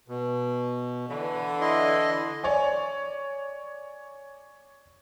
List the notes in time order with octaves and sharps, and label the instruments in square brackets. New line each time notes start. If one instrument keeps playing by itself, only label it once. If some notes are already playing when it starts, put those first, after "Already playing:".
[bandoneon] B2
[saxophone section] D3 E3
[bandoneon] E4 D#5 C6
[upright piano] C#5 D5 G#5